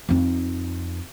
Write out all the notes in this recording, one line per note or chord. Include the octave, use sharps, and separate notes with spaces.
F2 D#4